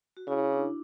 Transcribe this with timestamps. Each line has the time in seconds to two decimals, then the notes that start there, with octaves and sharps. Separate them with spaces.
0.17 F#4
0.27 C#3 E4
0.52 D4